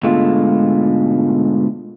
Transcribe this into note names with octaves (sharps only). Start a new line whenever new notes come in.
G#2 B2 D3 G#3 A3 F4